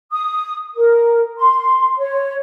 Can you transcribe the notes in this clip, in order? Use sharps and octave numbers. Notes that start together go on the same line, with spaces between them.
D#6
A#4
C6
C#5